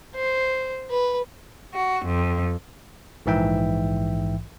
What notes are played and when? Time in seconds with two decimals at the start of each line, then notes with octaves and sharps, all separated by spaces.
0.16 C5
0.91 B4
1.74 F#4
2.06 F2
3.26 A#1 G#2 E3 E5 G5